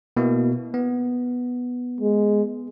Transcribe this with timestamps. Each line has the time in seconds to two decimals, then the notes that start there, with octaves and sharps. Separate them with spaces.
0.17 B2 A#3 E4
0.74 B3
2.01 G#3